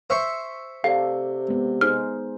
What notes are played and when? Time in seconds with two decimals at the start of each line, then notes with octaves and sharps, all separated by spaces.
0.10 C5 E5 C#6
0.84 C3 A4 D5 F5
1.48 G#3 B3
1.81 D#4 G#4 C5 F6